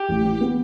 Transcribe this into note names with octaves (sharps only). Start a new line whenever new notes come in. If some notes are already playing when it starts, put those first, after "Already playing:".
Already playing: G4
A1
E3
B3